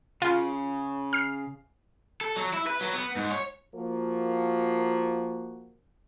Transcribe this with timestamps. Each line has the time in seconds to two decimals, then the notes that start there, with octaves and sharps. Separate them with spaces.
0.22 C#3 F4
1.13 F6 C7
2.21 A4
2.36 F#3
2.53 E4
2.67 B4
2.81 F#3
2.94 B3
3.16 G#2
3.31 C#5
3.73 F3 A#3 F#4 A#4